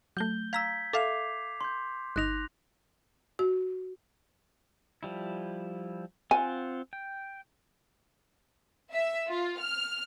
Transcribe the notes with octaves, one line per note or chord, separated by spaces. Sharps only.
F#3 A3 G6 G7
F5 A#5 E6 G#6 B6
A4 E5 F5 D6 C7 F7
C6 G6
G1 D#4 F#6 A#6 F7
F#4
F3 G3 E4
C4 F4 F#5 G#5
G5
E5
F4
F6